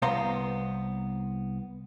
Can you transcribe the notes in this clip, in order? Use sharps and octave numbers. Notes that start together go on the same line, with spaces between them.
C2 B3 C5 F5 A#5 C6